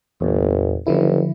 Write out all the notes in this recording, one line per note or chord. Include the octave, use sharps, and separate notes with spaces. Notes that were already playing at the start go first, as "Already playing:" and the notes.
G1 E2 A#2
F#1 D3 F3 E4